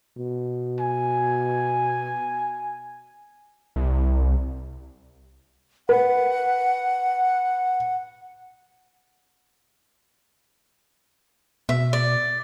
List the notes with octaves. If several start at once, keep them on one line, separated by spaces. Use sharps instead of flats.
B2
G#5
C2
B4 F#5
B2 E5
D5